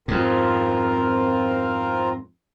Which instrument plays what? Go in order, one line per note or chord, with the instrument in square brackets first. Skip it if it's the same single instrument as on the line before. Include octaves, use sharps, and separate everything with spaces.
[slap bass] F2 G#2 [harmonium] C4 F4 A#4